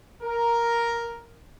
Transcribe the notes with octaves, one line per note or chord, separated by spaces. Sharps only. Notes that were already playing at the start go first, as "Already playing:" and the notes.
A#4